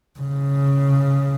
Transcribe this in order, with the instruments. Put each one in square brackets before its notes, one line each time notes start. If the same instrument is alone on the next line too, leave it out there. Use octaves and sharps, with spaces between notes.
[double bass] C#3